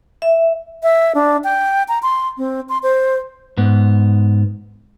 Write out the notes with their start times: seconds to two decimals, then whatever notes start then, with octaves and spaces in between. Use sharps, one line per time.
0.22 E5
0.83 E5
1.15 D4
1.44 G5
1.88 A#5
2.03 C6
2.38 C4
2.69 C6
2.83 C5
3.57 G#2 B3